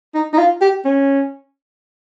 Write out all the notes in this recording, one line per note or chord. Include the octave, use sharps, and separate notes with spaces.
D#4
D#4
F4
G4
C#4